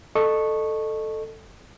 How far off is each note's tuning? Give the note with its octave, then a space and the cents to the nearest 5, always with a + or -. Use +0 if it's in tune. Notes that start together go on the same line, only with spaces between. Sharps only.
A4 +0 D#5 -30 C#6 -10